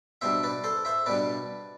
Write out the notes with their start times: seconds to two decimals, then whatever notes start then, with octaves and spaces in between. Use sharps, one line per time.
0.21 B2 G3 D4 C5 E5
0.43 B4 D5
0.64 A4 C5
0.85 C5 E5
1.06 B2 G3 D4 B4 D5